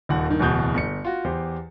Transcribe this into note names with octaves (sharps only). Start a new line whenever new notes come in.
D#1 D#2 F#5
G2 D#3
D1 E2 B2 G6
G1 C#7
F4 F#4
E2 G4 C5